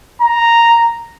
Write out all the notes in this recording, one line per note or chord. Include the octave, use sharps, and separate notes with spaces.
A#5